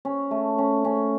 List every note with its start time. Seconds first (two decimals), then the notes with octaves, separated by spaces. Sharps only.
0.05 C#4
0.31 A3
0.58 C#4
0.85 C#4